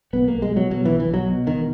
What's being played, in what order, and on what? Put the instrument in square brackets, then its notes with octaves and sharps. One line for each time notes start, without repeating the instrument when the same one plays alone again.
[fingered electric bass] B1 B3
B1 A#3
G#3
B2
F#3
B2 F#3
B1 E3
E3
B1 F#3
B2
E1 D#3